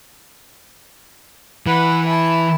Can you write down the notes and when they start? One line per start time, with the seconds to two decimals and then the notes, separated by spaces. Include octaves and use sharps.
1.66 E3 B4 F#5
2.06 E4 A5